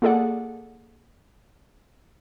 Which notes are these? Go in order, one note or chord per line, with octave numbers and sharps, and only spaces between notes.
A#3 F4 G#4 A4 D5 F#5